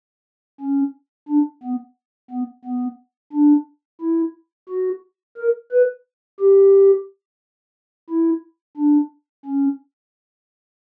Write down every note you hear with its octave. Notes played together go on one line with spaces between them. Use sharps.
C#4
D4
B3
B3
B3
D4
E4
F#4
A#4
B4
G4
E4
D4
C#4